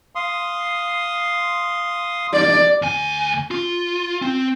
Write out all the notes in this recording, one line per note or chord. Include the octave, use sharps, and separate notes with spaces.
F5 C6 D#6
D5
D2 G#5
F4
C4